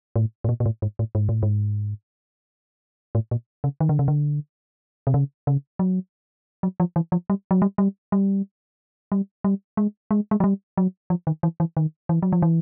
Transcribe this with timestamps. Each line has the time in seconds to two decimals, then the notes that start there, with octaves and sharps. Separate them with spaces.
0.16 A2
0.44 A2
0.49 A#2
0.60 A#2
0.66 A2
0.82 G#2
0.99 A2
1.15 G#2
1.29 A2
1.43 G#2
3.15 A2
3.31 A#2
3.64 C#3
3.80 D#3
3.89 D3
3.99 C#3
4.08 D3
5.07 C3
5.14 C#3
5.47 C#3
5.79 F#3
6.63 F#3
6.80 F3
6.96 E3
7.12 F3
7.30 G3
7.51 F#3
7.62 G3
7.78 G3
8.12 G3
9.12 G3
9.44 G3
9.77 G#3
10.11 G#3
10.31 G#3
10.40 F#3
10.44 G3
10.77 F#3
11.10 F3
11.27 D#3
11.43 E3
11.60 E3
11.77 D#3
12.09 E3
12.22 F#3
12.32 F3
12.42 E3